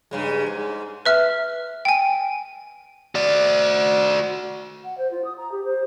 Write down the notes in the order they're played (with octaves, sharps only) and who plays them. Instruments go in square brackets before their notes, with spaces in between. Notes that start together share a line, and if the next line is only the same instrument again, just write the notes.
[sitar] G2 C#3 G#3
G#2
[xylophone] B4 E5 F6
G5 G#5
[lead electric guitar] F#4 D5
[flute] F#5
C5
F4
D#6
A#5
G4
C5